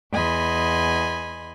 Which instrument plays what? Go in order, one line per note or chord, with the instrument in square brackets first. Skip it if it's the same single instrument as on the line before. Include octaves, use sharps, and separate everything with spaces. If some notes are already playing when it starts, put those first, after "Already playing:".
[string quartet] E2 D#5 G#5 B5 C6